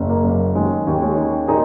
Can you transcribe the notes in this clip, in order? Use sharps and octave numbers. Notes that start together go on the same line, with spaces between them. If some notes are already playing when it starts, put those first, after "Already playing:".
Already playing: F#1
A#3
F#2
D#3 G#3 C#4
D#2
G#3 C#4
D#3
A#2 D#4 G#4